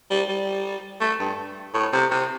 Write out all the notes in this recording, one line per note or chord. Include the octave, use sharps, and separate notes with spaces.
G3
G3
A3
G2
A2
C3
C3